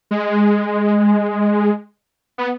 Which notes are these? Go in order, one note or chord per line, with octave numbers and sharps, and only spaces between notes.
G#3
B3